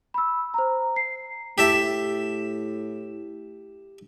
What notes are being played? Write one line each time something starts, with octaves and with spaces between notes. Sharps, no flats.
B5 E6
C5 A#5
C7
A2 G4 E5 A5